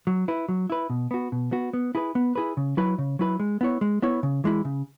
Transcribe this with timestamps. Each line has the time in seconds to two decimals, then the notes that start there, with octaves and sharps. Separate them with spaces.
0.07 F#3
0.28 E4 B4
0.49 F#3
0.70 E4 B4
0.90 B2
1.11 B3 F#4
1.32 B2
1.52 B3 F#4
1.73 B3
1.95 E4 G#4 B4
2.15 B3
2.35 E4 G#4 B4
2.57 C#3
2.77 F#3 E4 B4
2.98 C#3
3.19 F#3 E4 B4
3.40 G#3
3.61 B3 E4 C#5
3.81 G#3
4.02 B3 E4 C#5
4.23 C#3
4.44 E3 G#3 E4
4.65 C#3